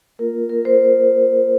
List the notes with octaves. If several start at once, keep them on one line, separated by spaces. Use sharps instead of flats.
A#3 F4 A#4
A#4
C5